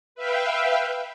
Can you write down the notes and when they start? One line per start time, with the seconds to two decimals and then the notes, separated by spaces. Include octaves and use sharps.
0.15 B4 E5 F5 G5